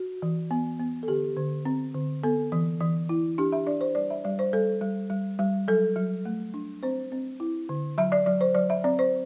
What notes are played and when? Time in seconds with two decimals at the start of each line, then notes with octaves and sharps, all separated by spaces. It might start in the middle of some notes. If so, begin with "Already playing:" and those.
Already playing: F#4
0.22 E3
0.51 B3
0.79 B3
1.03 A4
1.07 D3 G4
1.37 D3
1.65 C4
1.95 D3
2.23 B3 A4
2.52 E3
2.80 E3
3.09 E4
3.38 D4 G4
3.52 E5
3.67 D4 D5
3.81 C5
3.95 G3 D5
4.10 E5
4.24 G3 D5
4.39 C5
4.53 G3 A4
4.81 G3
5.10 G3
5.39 G3
5.68 F#3 A4
5.96 F#3
6.25 A3
6.54 D4
6.83 C4 C5
7.12 C4
7.40 E4
7.69 D3
7.98 F#3 E5
8.12 D5
8.26 F#3 D5
8.41 C5
8.55 F#3 D5
8.70 E5
8.84 C4 D5
8.99 C5